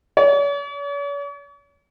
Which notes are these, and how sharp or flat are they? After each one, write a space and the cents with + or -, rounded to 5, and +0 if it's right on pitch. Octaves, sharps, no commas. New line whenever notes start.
C#5 +45